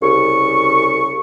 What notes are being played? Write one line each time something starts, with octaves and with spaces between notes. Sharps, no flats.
C2 C#3 C#6